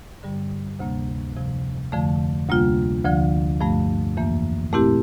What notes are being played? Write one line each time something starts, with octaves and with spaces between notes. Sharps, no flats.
G2 D3 G3
D2 C3 G3 A#3
F2 C3 F3
F2 D3 F3 A3
D2 C3 G3 A#3 F4
D2 D3 F3
G2 F3 A3
F2 E3 A#3
A#2 A3 C4 E4 G4